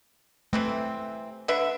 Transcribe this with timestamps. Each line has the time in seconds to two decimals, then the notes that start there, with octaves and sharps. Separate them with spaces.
0.53 C3 E3 A3 C4
1.48 D3 B4 E5